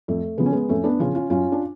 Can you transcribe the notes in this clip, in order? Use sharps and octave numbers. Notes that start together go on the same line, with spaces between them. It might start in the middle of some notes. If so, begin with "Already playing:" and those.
F2 A3
C#3 F3 B3
C#4
G#3 B3
F2 A3 C#4
B3 D4
C#3 F3 C#4 F4
C#4 F4
F#2 C#4 F4
D4